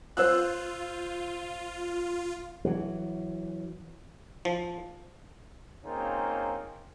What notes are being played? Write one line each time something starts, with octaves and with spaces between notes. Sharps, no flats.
F4 C5 E6 F#6
E3 F#3
F3
A#3 C4 C#4 D#4 F4 G#4